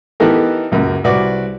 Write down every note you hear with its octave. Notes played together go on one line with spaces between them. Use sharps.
E3 B3 D#4 G4 A4 A#4
C#2 F#2 A#3
C2 F#4 B4 D5 D6